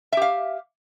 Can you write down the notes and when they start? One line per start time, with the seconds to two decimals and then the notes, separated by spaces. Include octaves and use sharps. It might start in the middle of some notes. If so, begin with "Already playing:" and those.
0.12 E5
0.17 G4
0.22 F5